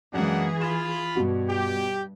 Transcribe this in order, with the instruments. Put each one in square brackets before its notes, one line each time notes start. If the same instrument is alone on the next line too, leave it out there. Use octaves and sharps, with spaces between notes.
[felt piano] F#2 G#3 [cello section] E3 G#4 [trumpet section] A#3 D4 F#5
[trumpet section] F4 B5 [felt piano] E7
[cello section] G2 [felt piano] B2 F#4
[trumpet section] G4